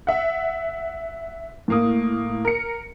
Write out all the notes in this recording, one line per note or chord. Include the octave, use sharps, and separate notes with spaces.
E5 F#5
A2 A#3 D#6
A#4 C#7